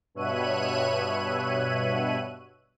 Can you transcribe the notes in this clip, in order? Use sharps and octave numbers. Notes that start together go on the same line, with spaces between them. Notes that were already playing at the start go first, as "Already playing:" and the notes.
G2 B2 C#5 E5 F#6 D#7